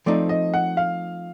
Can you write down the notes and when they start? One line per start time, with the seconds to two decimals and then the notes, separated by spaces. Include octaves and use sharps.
0.06 F3 A3 C4 D#4 D5
0.29 D#5
0.54 F#5
0.77 F5